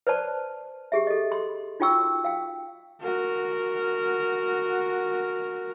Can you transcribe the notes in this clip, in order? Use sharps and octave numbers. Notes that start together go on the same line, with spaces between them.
B4 C5 D5 A5
G4 G#4 E5
A4 D#5
C6
D#4 F4 F#4 G5 C#6 E6
F5 G5
F#4 A#4